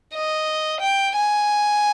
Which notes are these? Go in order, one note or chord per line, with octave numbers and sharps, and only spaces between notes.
D#5
G5
G#5